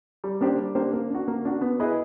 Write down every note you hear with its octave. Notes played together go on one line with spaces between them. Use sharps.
G3
A#3 D4 G4 C5
G3
A#3 D4 G4 C5
A#3
D4 F#4
A#3
D4 F#4
B3
E4 G#4 B4 D#5